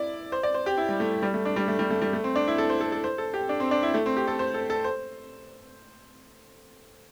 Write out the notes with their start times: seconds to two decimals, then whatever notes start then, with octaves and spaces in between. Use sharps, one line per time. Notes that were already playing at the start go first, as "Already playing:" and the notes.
Already playing: E4 D5
0.32 C5
0.43 D5
0.54 C5
0.66 G4
0.78 E4
0.89 G3
1.00 A3
1.22 G3
1.34 A3
1.45 D4
1.56 G3
1.68 A3
1.79 G3
1.90 A3
2.01 G3
2.13 A3
2.24 C4
2.36 D4
2.48 E4
2.58 A4
2.70 C5
2.81 A4
2.92 A4
3.04 C5
3.18 A4
3.34 G4
3.49 D4
3.60 C4
3.71 D4
3.83 E4
3.94 A3
4.06 C4
4.17 G4
4.27 A4
4.39 C5
4.54 A4
4.70 A4
4.84 C5